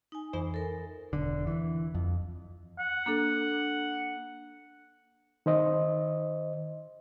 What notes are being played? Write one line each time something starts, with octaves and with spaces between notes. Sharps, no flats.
D#4 G#5
F2 E3 C5
A4 A#4
E1 D3
E3
F2
F#5
A#3 D4 A4
D#3 C5 D#5